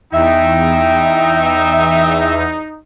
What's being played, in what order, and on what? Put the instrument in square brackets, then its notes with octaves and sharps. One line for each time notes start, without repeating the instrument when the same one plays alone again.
[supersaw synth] E2 [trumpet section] D#4 [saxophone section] E5 [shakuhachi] G5